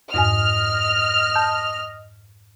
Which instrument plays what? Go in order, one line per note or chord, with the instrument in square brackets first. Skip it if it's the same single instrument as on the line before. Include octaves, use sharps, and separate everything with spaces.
[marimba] F2 G#2 G#5 [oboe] D#5 [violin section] F6
[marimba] A5 G6